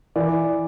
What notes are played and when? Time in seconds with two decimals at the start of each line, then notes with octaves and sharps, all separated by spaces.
0.16 E3 D5